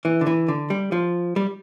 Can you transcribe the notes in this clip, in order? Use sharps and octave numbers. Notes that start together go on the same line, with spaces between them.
E3
D3
E3
D3
G3
F3
G3